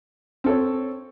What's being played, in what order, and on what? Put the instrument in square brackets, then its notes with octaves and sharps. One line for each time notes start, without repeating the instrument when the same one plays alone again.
[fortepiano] C4 A4 C#5